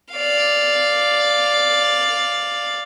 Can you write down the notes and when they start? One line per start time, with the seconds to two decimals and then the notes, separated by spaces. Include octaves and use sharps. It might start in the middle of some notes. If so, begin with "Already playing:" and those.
0.13 D5 F5